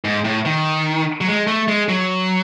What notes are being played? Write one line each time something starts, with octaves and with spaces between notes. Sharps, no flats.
G#2
A2
D#3
F#3
G#3
A3
G#3
F#3